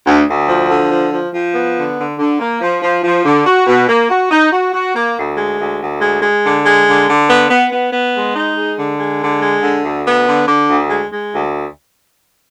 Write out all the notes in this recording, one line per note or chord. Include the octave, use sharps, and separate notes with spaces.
D2
D2
F3
D3
F3
F3
F3
B3
D3
D3
D3
A#3
F3
F3
F3
D3
F#4
B2
A#3
F#4
D#4
F#4
F#4
A#3
D2
G#3
D2
D2
G#3
G#3
D3
G#3
D3
D3
B3
B3
B3
B3
G#3
D#4
G#3
D3
G#3
D3
G#3
D3
D2
B3
D3
D3
D2
G#3
G#3
D2